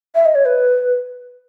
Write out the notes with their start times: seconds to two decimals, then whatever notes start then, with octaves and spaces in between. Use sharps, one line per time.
0.15 E5
0.25 D#5
0.35 C#5
0.45 B4